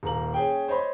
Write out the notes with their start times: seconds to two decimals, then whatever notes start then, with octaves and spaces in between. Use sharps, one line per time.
0.03 D#1 A#3 A#5 F#7
0.34 C#4 G#4 G5
0.68 C5 C#5 D#5 B5 C6